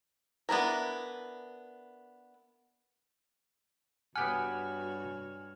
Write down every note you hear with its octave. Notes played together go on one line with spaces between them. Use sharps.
B3 D4 E4 A#4
G2 B3 F#4 G4 C#5 F#5 G#5 F6